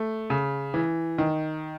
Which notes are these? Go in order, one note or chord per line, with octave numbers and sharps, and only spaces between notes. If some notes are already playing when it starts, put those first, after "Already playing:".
Already playing: A3
C#3
E3
D#3